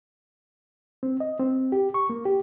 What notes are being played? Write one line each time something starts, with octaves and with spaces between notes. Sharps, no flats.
C4
D#5
C4
G4
C#6
A#3
G4